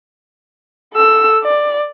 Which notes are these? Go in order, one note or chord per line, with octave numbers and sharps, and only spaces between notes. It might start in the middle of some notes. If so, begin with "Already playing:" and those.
A4 E6
D5